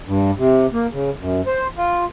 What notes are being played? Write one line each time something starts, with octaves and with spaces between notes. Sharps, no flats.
G2
C3
A#3
C#3
F#2
C5
F4